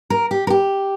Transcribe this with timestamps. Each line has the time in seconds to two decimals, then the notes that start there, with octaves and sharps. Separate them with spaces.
0.10 A#4
0.31 G4
0.47 A#4
0.50 G4